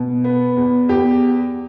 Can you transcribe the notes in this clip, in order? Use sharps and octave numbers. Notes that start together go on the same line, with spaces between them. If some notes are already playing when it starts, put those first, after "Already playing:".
Already playing: B2
B3
E2
E2 G4